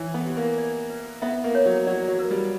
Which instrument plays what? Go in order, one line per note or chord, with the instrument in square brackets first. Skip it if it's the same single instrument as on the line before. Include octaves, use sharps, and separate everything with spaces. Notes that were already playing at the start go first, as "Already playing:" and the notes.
Already playing: [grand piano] E3 [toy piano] C#5
[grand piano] B3
[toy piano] G4
[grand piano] A#3
[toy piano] D5
B4
[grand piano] B3 [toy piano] E5
[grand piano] A#3
[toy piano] C#5
[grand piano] F#3
[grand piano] F#3 [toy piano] D5
[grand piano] F#3
[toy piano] A#4
[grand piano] G3